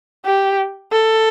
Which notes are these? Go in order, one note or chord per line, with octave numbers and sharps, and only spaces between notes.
G4
A4